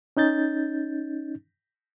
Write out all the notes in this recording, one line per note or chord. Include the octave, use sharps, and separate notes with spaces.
C#4 D#4 G6 A6